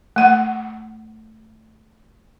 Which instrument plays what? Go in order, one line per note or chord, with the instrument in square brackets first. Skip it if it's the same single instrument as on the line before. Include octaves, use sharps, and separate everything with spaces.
[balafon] A3 F#5